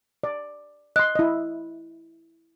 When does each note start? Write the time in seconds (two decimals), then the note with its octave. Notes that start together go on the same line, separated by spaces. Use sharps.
0.24 D5
0.96 D#5 C6 F#6
1.15 E4 D#5